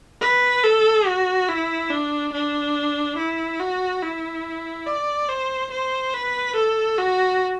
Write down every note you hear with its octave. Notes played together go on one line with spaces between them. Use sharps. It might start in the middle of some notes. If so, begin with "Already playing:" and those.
B4
A4
F#4
E4
D4
D4
E4
F#4
E4
D5
C5
C5
B4
A4
F#4